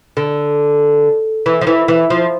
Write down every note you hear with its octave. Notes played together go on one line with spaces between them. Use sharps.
D3
E3
F3
E3
E3
F3